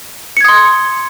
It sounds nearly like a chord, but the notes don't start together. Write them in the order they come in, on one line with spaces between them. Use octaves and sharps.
C#7 G#6 D#6 C6